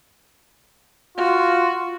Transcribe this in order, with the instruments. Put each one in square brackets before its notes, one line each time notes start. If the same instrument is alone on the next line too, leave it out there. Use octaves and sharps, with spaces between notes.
[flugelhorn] F4 [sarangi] F#4